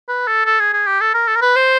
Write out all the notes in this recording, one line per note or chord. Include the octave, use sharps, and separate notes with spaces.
B4
A4
A4
G#4
G#4
G4
A4
A#4
A4
A#4
B4
C5